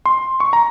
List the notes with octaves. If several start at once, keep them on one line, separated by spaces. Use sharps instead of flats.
C6
C#6
A#5